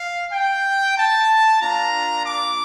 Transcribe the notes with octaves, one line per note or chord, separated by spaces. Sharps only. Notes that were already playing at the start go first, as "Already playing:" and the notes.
Already playing: F5
G5
A5
A#3 D4 F4 A#5
D6